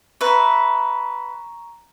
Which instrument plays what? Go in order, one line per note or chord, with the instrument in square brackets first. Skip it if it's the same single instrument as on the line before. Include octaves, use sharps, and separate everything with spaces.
[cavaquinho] B4 E5 [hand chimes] A#5 C#6